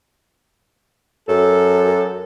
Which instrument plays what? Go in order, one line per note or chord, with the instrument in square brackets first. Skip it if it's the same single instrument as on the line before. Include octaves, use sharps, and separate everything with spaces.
[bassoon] F#2 [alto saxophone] A4